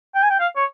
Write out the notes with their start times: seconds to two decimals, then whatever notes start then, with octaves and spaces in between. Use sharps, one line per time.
0.15 G5
0.23 G#5
0.30 G5
0.40 F5
0.56 C#5